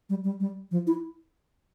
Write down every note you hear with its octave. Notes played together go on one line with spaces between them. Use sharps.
G3
G3
G3
F3
E4